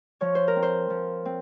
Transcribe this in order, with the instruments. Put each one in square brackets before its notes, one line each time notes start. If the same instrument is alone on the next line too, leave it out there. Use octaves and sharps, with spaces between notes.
[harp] F3 C#5
C5
A#4
C4
C5
F3
C4